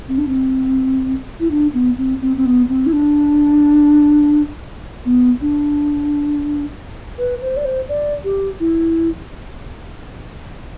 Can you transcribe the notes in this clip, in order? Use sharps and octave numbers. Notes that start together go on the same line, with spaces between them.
C4
D4
C4
E4
D4
B3
C4
C4
C4
B3
C4
E4
D4
B3
D4
B4
C5
D5
C5
D5
G4
E4